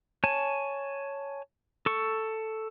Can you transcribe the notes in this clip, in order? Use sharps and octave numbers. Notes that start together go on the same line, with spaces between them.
C#5 G#5 A5
A4 C#6